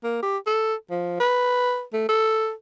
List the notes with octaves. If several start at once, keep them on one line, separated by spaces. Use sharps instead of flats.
A#3
G4
A4
F3
B4
A3
A4